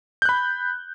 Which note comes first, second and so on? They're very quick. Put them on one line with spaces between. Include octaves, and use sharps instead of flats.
G6 F#6 B5